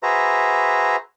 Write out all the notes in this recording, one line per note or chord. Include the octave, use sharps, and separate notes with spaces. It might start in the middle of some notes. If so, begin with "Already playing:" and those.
F#4 G#4 B4 C5 E5 A#5